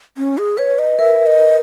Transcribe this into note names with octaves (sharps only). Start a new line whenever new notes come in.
C#4
G#4
B4 C#5
D#5
A#4 E5
D#5